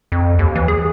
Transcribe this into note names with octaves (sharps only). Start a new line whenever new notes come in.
F2
D#2
E3
G#4